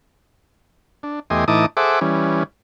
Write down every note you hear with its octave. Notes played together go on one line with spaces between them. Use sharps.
D4
E2 A3 G4 D#5 G#5 C6
A2 E3 D#4 A5 D6 D#6
G#4 A4 C5 E5 F#5 D6
E3 G3 C#4